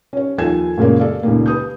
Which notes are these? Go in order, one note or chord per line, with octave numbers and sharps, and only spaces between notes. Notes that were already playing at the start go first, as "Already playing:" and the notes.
C#4 C#5
D#2 F3 A4 G#5 G#6 E7
F#2 A#2 C#3 G#3 A#3
A4 D5 F5
C#2 A#2 D#3 A#3
B4 D#6 G6